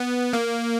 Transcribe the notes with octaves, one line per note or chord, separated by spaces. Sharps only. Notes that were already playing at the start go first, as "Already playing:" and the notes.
Already playing: B3
A#3